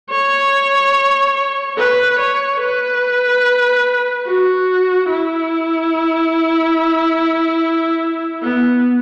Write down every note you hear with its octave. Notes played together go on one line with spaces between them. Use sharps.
C#5
B4
C#5
B4
F#4
E4
B3